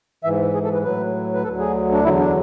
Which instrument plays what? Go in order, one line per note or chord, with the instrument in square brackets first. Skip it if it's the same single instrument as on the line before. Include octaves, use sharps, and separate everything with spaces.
[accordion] G#2 E3 E5
G#4
A4
B4
A2 F#3 B4
B4
D2 D3 F#3 A4
G#4
D4
E2 D3 F#3 E4
D4